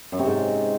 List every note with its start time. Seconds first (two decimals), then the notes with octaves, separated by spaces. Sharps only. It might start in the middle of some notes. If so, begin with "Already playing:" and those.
0.12 F#2
0.19 C3
0.26 G#2